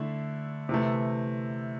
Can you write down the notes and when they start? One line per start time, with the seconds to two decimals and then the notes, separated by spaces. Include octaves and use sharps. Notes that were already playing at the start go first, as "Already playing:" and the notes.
Already playing: D3 A3 E4
0.69 C3 E3 A3